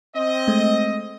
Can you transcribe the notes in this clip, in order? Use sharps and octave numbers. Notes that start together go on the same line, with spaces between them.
C4 D#5
G#3 A3